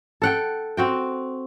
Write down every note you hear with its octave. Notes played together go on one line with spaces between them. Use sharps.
A4 F#5 G5
C4 F#4 G5